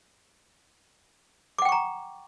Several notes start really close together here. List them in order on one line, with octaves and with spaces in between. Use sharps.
D6 F#5 G5 C#6 A#5